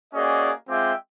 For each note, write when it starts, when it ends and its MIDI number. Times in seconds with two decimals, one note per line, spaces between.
0.14 0.52 58
0.14 0.52 61
0.14 0.52 66
0.14 0.52 68
0.14 0.52 74
0.14 0.52 75
0.68 0.92 56
0.68 0.92 60
0.68 0.92 65
0.68 0.92 76
0.68 0.92 79
0.68 0.92 86